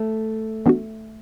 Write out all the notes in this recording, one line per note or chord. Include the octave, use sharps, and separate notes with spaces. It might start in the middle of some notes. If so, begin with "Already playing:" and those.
Already playing: A3
E3 B3 D4 F#4